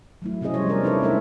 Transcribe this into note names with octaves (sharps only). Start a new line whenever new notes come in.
F#3 A3 E4
C3 C4 C#4 G#4 D#5
F3 G3 C5 C#5
B3 D4 A#4 D5
C#4 D#4 E4 A4 B4 C#5
G#3 A3 C4 D4 A#4 E5